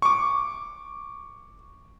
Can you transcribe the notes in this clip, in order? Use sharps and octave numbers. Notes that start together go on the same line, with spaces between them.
C#6 D6